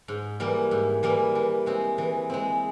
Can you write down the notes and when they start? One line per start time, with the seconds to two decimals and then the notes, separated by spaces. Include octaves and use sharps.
0.08 G#2
0.40 E3 G3 A#3
0.71 G#2
1.03 E3 G3 A#3
1.35 E3
1.66 G#3 C4
1.98 E3
2.30 G#3 C4